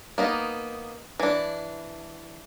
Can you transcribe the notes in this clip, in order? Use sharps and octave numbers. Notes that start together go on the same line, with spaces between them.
A#3 B3 D#4
E3 D4